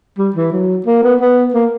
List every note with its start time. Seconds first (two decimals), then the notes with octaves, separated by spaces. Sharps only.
0.18 G3
0.36 E3
0.52 F#3
0.86 A#3
1.03 B3
1.21 B3
1.54 A#3